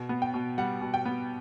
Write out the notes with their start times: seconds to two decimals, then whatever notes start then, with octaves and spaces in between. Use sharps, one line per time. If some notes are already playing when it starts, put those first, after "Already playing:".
Already playing: B2
0.09 B3
0.22 G5
0.34 B2
0.58 G3 F#5
0.81 B2
0.94 G5
1.05 B3